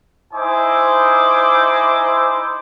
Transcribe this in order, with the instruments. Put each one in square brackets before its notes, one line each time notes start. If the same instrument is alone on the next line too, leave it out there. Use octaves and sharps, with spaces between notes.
[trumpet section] D#4 E4 C5 G#5 D6